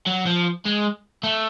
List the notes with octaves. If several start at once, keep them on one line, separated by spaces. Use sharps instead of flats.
F#3
F3
G#3
A3